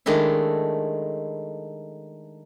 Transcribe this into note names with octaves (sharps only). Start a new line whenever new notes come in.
D#3 G#3 A3 D4 E4